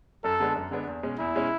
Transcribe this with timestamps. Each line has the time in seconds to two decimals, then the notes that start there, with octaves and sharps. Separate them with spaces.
0.24 F#2 A4
0.40 D3 G#3 B3 D4
0.56 F#2
0.71 D3 G#3 B3 D4
0.87 E2
1.03 B2 G#3 C#4
1.19 E2 E4
1.35 B2 G#3 C#4